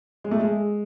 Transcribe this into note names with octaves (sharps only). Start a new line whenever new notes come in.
G#3
A3
G#3